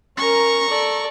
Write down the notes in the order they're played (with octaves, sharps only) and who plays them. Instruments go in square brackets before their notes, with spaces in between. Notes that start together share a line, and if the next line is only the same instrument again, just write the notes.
[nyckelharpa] C#4 A#4 [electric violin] A#5 C#6
[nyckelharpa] A4 D5